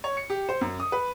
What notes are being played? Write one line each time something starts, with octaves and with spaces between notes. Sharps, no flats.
C#5
C#7
G4
C5
F#2
D#6
B4